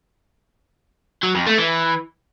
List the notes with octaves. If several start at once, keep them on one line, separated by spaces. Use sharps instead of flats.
F#3
F2
A3
E3